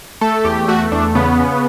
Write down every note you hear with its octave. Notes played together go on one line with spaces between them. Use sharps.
A3 A4
E2 G4
A3 F#4
E2 D4
C#3 B3
C#3